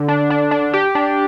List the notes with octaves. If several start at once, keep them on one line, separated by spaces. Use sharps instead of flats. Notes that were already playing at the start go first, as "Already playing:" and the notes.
Already playing: D3
D4
D4
D4
G4
D4